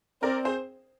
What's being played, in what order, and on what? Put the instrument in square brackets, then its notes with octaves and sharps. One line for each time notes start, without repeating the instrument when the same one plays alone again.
[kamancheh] C4 [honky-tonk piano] A#4 D5
[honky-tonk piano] G#4 C5